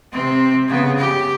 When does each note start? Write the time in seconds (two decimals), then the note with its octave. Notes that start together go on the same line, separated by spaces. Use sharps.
0.12 C3 C4
0.68 C#3 B3
0.98 G4